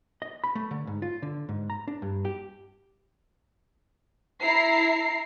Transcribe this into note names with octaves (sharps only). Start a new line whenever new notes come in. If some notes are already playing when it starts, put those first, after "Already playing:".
D#5
B5
A3
D3
G#2
F4
D3
G#2
A#5
D4
G2
G4
E4 A#5 C7